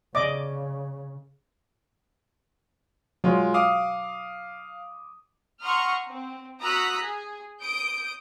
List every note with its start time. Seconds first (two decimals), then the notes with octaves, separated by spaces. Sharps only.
0.15 C#3 D5 D#5 D6
3.24 F#3 G#3 F4
3.54 F5 D6 D#6
5.62 F#5 A#5 C6 C#6 D#6 F6
6.09 C4
6.61 F#4 A#5 D#6 E6 F#6 B6
7.00 G#4
7.60 D#6 G6 D7